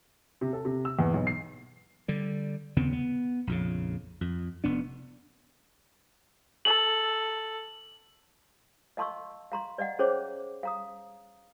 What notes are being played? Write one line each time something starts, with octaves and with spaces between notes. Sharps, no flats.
C3
A4
C3
E6
E2
B1
C7
D3 G3
D#2 C#3 B3 C4
B3
A#1 F2 C#3
F2
F1 B3 D4
A4 F#7
D#5 F5 A5 C6 C#6 E6
F5 A#5 C6
D5 D#5 F5 F#5
C#4 G#4 C5 C#5 D6
F5 A#5 D#6